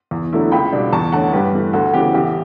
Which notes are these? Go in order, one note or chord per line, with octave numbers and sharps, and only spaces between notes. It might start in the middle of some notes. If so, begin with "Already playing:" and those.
E2
D3 F#3 A3 E4
C#2 G5 B5
B2 G3 D4
E2 A5 C#6
D3 A3 C#4 F#5 A5
G2 G4 B4
E3 A3
D2 F#4 A4
C#3 E3 B3 G4
A1 G4